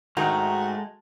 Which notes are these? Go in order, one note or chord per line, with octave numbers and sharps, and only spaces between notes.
G#2 D#3 G#3 A3 F#4 A#5